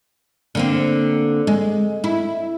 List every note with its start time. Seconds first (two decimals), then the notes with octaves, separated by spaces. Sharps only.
0.55 D3 A#3 C4
1.47 G#3
2.04 E4